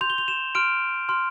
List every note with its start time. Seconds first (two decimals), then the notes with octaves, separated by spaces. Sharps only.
0.01 C6 G6 F7
0.10 G7
0.18 F7
0.28 E7
0.55 C6 F6 D7
1.09 C6 F6